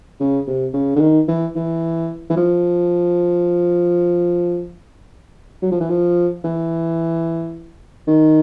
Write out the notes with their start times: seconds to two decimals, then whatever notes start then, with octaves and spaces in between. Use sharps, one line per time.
0.20 C#3
0.47 C3
0.73 C#3
0.96 D3
1.01 D#3
1.28 E3
1.56 E3
2.30 E3
2.36 F3
5.62 F#3
5.71 F3
5.80 E3
5.90 F3
6.44 E3
8.07 D#3